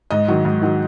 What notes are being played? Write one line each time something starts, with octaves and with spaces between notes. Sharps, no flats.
G#2 D#5
D#3 F#3
G#2
D#3 F#3